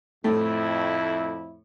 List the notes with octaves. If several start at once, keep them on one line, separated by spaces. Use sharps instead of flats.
F2 A2 A3 E4